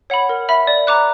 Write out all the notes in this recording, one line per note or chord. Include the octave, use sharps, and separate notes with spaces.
C#5 F#5 B5
A#4
E5 B5
D5
A#5 D6 F#6